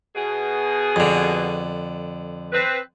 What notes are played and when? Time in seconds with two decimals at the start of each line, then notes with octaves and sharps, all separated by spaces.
0.16 B2 G#4
0.96 F2 D3
2.51 C4 B4